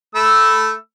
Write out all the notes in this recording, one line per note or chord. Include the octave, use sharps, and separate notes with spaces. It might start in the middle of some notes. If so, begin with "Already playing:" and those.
A3 B5 E6